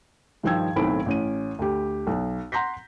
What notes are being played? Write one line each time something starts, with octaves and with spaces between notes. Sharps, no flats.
G2 D#3 F3 G5 E6 G#6
B1 A2 D#3 C4 B5 D7
A1 C#4 D#7
D2 G4
B1
F#5 A#5 C6 G6 A#6 B6